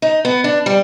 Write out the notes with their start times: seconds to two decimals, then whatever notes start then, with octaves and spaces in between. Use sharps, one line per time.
0.02 D#4
0.25 B3
0.44 D4
0.66 G3